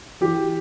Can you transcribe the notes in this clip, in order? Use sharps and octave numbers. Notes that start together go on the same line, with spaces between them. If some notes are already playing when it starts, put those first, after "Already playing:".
E3 G4